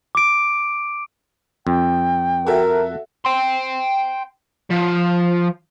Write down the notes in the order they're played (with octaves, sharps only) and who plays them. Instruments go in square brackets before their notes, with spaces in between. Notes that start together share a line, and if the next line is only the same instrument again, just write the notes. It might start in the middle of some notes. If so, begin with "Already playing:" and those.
[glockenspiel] D6 D7
[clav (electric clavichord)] F2 [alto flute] G5
[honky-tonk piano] F#4 A4 E5 [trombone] A#4
[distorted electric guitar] G5 C6
F3